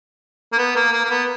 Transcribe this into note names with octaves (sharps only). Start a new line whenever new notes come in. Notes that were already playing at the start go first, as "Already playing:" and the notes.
A#3
B3
A#3
A#3
A#3
B3